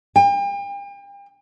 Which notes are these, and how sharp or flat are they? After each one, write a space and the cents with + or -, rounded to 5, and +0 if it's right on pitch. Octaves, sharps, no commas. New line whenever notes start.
G5 +40